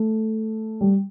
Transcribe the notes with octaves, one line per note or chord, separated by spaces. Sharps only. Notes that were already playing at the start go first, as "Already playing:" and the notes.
Already playing: A3
G3